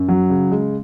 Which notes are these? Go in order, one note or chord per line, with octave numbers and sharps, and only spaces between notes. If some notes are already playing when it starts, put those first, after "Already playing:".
Already playing: F#2
F#3
C#3
G#3